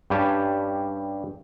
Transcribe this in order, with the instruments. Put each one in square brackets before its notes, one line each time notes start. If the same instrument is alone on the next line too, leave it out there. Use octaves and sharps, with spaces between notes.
[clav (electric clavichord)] G2 G3 C#4 G4 G#5 A5